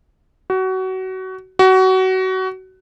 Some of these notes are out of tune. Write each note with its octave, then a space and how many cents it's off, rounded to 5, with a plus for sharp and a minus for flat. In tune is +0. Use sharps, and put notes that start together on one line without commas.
F#4 +25
F#4 +25